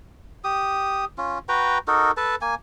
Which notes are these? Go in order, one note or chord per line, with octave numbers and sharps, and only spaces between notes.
G4 D#6
C#4 F4
F#4 B4 G5 A#5
D#4 F#4 A4 A#4
A4 B4 A5
A#3 G#5